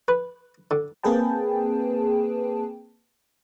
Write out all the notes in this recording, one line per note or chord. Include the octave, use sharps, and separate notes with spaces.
B4
D3
A#3 C4 G#4 B4 G5 A5